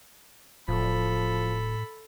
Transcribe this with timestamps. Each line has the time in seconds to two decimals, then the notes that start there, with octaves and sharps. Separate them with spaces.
0.68 D1 A2 F3 A4 B5